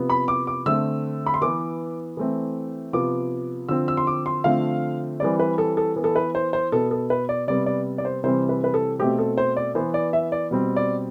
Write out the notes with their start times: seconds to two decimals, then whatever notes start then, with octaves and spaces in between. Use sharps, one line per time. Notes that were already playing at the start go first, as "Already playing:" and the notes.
Already playing: C3 F3 B3
0.10 B5
0.28 D6
0.47 D6
0.66 D3 A3 C4 E6
1.26 B5
1.34 C6
1.42 E3 B3 D6
2.17 E3 A3 C4
2.93 C3 F3 B3 D6
3.69 D3 F3 C4 E6
3.88 E6
3.97 C6
4.07 D6
4.26 C6
4.44 D3 F3 A3 C4 F5
5.20 E3 G3 C4 D5
5.39 B4
5.58 A4
5.77 A4
5.96 E3 B3
6.04 A4
6.16 B4
6.35 C5
6.53 C5
6.72 B2 B3 A4
6.91 A4
7.10 B4
7.29 D5
7.48 C3 G3 B3 D5
7.66 D5
7.98 D5
8.05 C5
8.23 C3 E3 G3 C4 C5
8.49 B4
8.64 B4
8.74 A4
8.99 B2 A3 C4 G4
9.18 A4
9.38 C5
9.57 D5
9.75 E3 B3 C5
9.94 D5
10.13 E5
10.32 D5
10.51 B2 G3 C4
10.76 D5